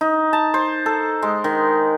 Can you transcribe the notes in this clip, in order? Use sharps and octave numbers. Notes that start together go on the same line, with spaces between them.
D#4
A5
C5
A4
G#3
D#3